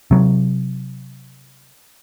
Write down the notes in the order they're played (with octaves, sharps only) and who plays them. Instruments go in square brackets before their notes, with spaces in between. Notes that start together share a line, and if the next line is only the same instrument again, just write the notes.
[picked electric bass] C3 F#3